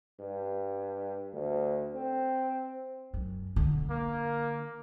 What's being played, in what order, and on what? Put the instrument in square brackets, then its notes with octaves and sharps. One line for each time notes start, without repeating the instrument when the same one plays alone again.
[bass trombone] G2
D2
C4
[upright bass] F#2
D3
[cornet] A#3